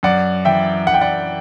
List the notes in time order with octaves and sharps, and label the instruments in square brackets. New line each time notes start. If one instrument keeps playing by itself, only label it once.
[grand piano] F#2 D5 F#5
E3 E5 G5
F#2 F#5
G5
D5 F#5